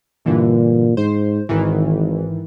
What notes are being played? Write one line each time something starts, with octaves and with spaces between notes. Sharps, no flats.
G2 A#2 D3 E3
G#2 C5
G#1 G#2 D#3 E3